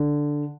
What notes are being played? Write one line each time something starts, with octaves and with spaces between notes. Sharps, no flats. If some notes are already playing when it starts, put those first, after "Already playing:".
Already playing: D3